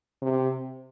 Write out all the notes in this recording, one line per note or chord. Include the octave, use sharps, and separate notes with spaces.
C3